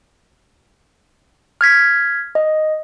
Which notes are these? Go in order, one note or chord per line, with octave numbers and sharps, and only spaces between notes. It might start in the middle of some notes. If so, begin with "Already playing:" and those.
F6 G#6 B6
D#5